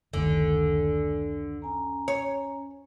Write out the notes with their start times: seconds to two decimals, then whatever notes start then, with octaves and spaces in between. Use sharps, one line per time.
0.13 F#1 D2 D3 D#3 G#5
1.62 C#4 G#5 A#5
2.08 C#5